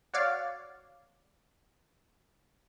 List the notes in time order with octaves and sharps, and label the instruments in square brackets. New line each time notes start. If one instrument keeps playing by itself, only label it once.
[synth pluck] F#4 C#5 D5 F5